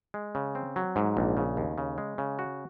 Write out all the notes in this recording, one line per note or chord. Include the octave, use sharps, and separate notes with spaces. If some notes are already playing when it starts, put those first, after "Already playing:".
G#3
C#3
C4
F#3
G#2
A#1
C#3
D#2
C#3
G#3
C#3
F#4